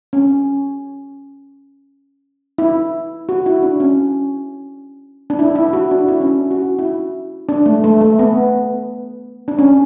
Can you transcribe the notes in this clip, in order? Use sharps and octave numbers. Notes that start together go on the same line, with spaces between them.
C#4
E4
F#4
E4
D4
C#4
D4
E4
E4
F#4
D4
E4
C#4
D4
F#4
E4
E4
D4
A3
A3
A3
B3
D4
C#4